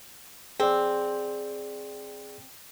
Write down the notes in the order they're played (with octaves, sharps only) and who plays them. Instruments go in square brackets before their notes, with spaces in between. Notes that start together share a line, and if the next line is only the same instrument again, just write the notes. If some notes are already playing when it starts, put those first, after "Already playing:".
[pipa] C4 [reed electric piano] G#4 D5